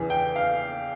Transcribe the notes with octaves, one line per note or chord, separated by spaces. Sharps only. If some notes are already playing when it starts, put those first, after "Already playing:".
Already playing: E2 C#3 E3
G5
F5